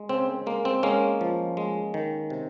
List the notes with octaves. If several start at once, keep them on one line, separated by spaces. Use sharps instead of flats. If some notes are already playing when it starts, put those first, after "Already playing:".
Already playing: G#3
C#3 C4
G#3 A#3
C4
G#3 A#3 C#4
F3
G#3
D#3
C3